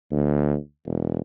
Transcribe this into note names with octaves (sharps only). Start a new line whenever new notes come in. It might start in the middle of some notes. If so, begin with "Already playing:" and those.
D2
E1